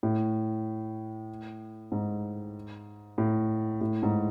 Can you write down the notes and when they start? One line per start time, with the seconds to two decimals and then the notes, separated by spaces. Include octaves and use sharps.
0.03 A2
1.92 G#2
3.18 A2
3.81 A2
4.03 G#2